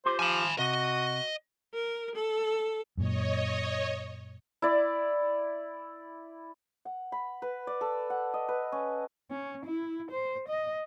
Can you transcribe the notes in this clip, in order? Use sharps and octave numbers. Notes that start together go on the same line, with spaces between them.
F4 G4 C5 C6
F3 G#5 B5
C3 F#4 D#5
A#4
A4
F#2 A#2 C#5 D#5
E4 D5
F#5
B5
B4
D5
A4
F#5
D#5
B4
C#4
C#4
E4
C5
D#5